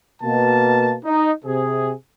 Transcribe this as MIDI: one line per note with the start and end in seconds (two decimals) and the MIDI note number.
0.23 0.96 47
0.23 0.96 58
0.23 0.96 81
1.05 1.32 63
1.45 1.91 48
1.45 1.91 68